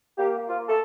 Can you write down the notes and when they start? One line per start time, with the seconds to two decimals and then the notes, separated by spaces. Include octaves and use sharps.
0.17 A#3 G4
0.38 A#3
0.48 F4
0.58 A#3
0.68 A4